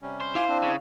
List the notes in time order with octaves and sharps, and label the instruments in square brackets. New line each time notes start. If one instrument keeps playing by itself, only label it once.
[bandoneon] C3 G3 C#4
[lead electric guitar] C5
[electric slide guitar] E4 F5 [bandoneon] G#5 C6 D6
[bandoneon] C4 D4
[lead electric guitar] C#3